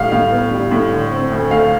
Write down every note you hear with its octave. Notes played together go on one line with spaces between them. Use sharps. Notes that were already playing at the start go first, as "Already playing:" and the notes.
Already playing: A2 G3 F5
A2 F5
B3
G3
A2
D3
C4
D2
A3 F5